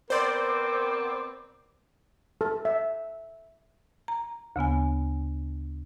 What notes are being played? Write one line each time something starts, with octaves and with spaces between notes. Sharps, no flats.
B3 C4 A#4 C5 D5 D6
A4
E5
A#5
D2 C#3 B3 G#5